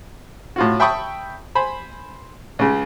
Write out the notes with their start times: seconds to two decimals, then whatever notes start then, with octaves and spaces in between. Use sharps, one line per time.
0.56 A2 F4 F#4
0.80 E5 G5 A5 B5 C#6 D#6
1.55 C5 G#5 B5
2.59 C#2 C#3